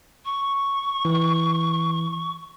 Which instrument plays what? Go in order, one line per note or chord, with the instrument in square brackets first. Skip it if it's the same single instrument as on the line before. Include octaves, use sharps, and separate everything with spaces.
[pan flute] C#6
[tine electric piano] E3